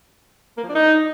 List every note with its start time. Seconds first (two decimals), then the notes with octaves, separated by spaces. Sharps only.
0.58 A#3
0.63 F3
0.69 D4
0.75 D#4